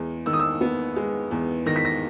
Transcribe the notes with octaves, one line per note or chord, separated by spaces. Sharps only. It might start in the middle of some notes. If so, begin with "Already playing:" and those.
Already playing: E2 G#3
D#3 E6
D#6
E6
B3
G#3
E2
D#3 A#6
B6
A#6